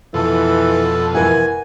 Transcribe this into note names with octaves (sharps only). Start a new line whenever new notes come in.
F2 B2 E3 A4
E3 A#4 F#5 G#5